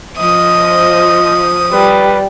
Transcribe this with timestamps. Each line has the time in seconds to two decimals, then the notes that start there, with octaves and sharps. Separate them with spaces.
0.18 F3 D#5 D#6
1.72 G3 B4